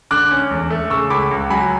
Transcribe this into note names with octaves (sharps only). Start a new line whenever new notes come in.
D3 D6 F#6
C#4
E2
A3
C#3 C#6 E6
C#2 B5 D6
C#2
F#3 G#5 B5